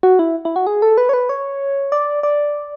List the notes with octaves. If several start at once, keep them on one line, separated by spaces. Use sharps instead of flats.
F#4
E4
E4
F#4
G#4
A4
B4
C#5
B4
C#5
D5
D5